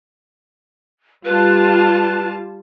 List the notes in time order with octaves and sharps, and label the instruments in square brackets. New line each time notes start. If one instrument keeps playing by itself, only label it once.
[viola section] G3 F4 A5 [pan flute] B4